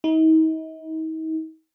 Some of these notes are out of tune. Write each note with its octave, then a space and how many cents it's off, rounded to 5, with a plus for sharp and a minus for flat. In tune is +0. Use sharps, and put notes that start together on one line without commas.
D#4 +40